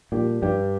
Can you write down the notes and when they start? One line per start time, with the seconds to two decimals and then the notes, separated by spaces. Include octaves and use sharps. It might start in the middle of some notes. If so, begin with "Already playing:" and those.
0.12 A#2 G3 D4 G4
0.42 G2 G3 D4 G4